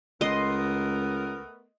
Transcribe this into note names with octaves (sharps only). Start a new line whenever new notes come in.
C#2 A3 B3 A#4 D#5 C6